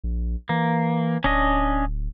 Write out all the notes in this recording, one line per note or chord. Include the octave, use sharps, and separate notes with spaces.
A#1
E3 A#3
D1 C#4 D4 D#5